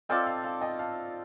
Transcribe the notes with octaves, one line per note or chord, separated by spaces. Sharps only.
C4 F4 A4 D5 D#5 G5
F5 A5
F5 A5
D#5 G5
F5 A5